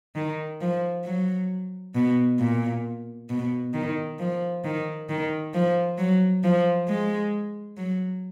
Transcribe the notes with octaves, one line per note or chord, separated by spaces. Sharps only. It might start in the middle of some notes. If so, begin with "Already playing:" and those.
D#3
F3
F#3
B2
A#2
B2
D#3
F3
D#3
D#3
F3
F#3
F3
G#3
F#3